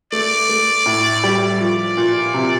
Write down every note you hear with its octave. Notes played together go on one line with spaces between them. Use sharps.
A3 D5
A3
A2
G3
F3 D5
A#2
C3